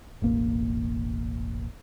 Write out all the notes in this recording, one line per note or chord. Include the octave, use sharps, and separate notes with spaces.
E1 A1 A#3